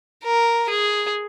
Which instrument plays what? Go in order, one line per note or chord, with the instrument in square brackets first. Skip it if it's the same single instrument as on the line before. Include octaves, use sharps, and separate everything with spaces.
[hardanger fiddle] A#4
G#4